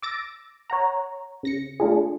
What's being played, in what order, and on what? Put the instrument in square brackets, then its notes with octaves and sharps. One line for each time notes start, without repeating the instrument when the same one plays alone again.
[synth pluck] D6 E6 A6 A#6 D7
C#5 F#5 A#5
C#3 A#6 C#7
A3 D4 F4 G#4